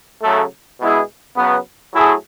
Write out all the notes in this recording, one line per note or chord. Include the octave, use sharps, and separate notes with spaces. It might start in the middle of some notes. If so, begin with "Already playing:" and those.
C#3 F#3 A3
B2 G#3 B3 E4 G#4
C#3 F#3 B3
F#3 A3 E4 G#4